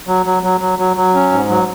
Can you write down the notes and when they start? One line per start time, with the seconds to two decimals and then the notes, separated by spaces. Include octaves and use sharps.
0.07 F#3
0.26 F#3
0.43 F#3
0.61 F#3
0.79 F#3
0.97 F#3
1.14 C#4
1.32 G#2
1.50 F#3